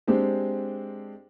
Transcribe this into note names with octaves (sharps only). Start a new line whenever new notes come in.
G#3 C4 D4 G4